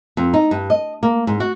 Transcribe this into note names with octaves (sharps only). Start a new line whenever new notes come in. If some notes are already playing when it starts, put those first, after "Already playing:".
F2
D#4
G2
D#5
A#3
G#2
F#4